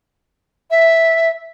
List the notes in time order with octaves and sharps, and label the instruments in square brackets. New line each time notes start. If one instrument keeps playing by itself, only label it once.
[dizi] E5